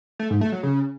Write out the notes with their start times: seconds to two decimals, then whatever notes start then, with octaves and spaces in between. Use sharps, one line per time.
0.19 A3
0.30 G#2
0.41 A3
0.52 F#3
0.63 C#3